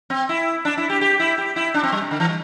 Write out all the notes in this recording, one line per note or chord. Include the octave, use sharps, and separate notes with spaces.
C4
E4
D4
E4
G4
G4
E4
G4
E4
D4
C4
G3
C3
D3
E3
G3